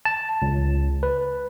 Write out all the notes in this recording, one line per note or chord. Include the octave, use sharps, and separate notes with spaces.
A5
C#2
B4